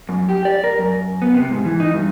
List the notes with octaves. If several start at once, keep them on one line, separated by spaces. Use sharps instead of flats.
F#2
G4
D5
A#4
F#2
B3
C3
G#2
E3
D#4
G2